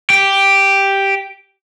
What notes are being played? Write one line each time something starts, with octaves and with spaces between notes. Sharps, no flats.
G4